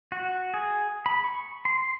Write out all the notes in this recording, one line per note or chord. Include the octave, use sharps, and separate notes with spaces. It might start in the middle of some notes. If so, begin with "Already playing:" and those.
F#4
G#4
B5
C#6
C6